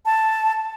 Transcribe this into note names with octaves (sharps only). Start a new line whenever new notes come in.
A5